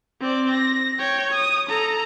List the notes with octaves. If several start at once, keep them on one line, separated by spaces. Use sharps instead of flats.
C4 D5
A#6
C#5 G5
D#6
A4 A#5